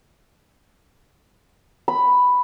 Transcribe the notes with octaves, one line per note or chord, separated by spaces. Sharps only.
B5